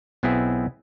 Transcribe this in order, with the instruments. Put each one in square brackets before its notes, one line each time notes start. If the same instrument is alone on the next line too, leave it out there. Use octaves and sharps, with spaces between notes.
[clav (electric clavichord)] B1 B3 C4 E4 G#4